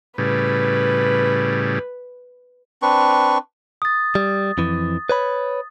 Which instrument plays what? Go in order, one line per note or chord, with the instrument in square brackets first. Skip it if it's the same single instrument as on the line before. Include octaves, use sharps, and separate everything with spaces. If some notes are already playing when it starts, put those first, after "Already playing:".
[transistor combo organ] A2 C#3 G3 [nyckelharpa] B4
[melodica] C4 D4 B4 C#6
[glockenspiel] D#6 A6
[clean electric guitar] G3
F2 E3
B4 C#5 B5